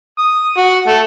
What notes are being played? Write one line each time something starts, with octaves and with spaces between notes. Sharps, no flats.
D#6
F#4
A3